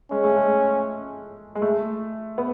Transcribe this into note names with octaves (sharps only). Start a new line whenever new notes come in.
G#3 C#4
A3
G#3
G#3
A3
B3